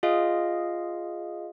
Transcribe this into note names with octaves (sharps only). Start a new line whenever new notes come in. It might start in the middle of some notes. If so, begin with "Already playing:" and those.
F4 G#4 D#5 F5